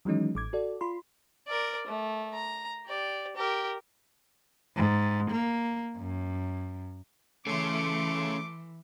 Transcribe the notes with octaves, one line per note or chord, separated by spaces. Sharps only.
D#3 E3 F#3 G#3 C#4 D#4
A1 D6 G#6
F#4 A4 D5
F4 B5 C6
A#4 D5
A3
A#5
G4 D5
G4 A#4
G#2
A#3
F#2
E3 A3 C#4 G#4 C6 D6 C#7